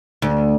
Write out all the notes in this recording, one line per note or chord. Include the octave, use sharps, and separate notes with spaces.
D2